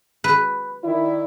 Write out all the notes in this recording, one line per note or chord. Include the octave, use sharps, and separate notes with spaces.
B4
D#3 E4 D5